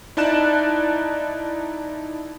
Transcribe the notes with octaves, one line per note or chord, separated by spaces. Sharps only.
D#4 E4 D5 A5 F#6 E7